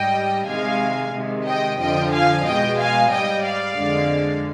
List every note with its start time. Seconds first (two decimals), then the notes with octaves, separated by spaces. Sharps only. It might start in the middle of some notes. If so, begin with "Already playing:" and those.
Already playing: G#2 G3 D#5 G5
0.48 C3 D#3 G#3 F5 G#5
1.14 C3 D#3 G#3
1.46 D#5 G5
1.80 F2 D3 F3 D#5 G5
2.13 F5 G#5
2.46 B2 G#3 D#5 G5
2.78 F5 G#5
3.12 G#2 G3 D#5 G5
3.44 D5 F5
3.77 F2 D3 G#3